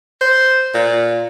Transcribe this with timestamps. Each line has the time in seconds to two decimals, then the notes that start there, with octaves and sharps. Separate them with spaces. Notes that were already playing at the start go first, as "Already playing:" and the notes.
0.21 C5
0.74 A#2